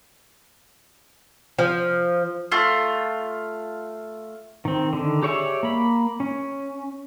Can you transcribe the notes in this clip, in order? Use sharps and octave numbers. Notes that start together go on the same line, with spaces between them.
F3
A3 F4
D#3 C4
D3 D#3
G4 G#4 C#5 D5 E5
A#3 B5
C#4